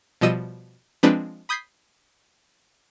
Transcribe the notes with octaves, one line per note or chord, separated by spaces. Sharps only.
B2 F3 G3 D#5 E6 D#7
F3 G#3 C4 D4 B4
B5 D#6 G6 G#6 B6 C7